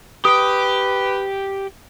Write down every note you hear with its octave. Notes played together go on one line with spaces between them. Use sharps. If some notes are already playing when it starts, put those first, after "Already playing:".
G4 B4 G5 D#6